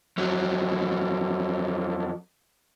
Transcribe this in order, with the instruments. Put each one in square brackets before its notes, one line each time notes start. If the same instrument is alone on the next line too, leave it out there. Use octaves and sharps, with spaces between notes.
[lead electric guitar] F2 F#3